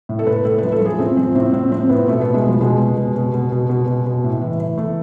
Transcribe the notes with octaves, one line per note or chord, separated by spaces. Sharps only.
A2
A4
A2 B4
A2 A4
B4
F3
A4
F3 G#4
A2 C4
F3 C4
A2 C4
A2 C4
F3 C4
A2 B3
B2 A3
B2 B3
G#3
B2 F3
B2 G#3
B2
B2
B2
B2
B2
B2
B2
B2
A2
E3
E3
E3 A3